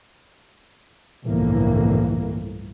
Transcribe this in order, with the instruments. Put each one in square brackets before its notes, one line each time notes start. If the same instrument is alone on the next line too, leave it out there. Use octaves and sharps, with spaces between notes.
[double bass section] G1 C2 F2 A2 E3 A#3